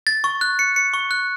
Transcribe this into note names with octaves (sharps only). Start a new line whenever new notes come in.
A6
C#6
F#6
C#7
C#7
C#6
F#6